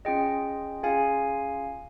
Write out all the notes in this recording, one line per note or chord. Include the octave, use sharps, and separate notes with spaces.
C#4 F4 G#4 D#5 G5
C#4 F4 G#4 F5 G#5